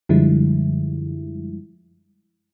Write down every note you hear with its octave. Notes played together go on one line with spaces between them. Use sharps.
F#2 D3 F3 G3 G#3 E4